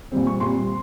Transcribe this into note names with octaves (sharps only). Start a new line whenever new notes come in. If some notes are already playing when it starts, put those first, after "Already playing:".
A#2 G3 C4
C#6
A#2 G3 C4 C6